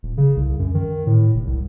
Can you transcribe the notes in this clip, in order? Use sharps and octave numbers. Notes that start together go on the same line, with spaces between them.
D#1
C#3
C2
F#2
D#3
A2
F1
C2